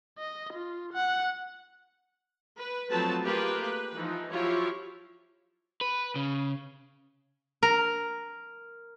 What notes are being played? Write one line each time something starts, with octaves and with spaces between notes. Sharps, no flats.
D#5
F4
F#5
B4
F3 F#3 A3 C4 B4 A5
A3 A#3 F4 G4 G#4 B4
B4
E3 F3 D#4
F3 F#3 E4 F4 G4 C#5
B4
C#3
A#4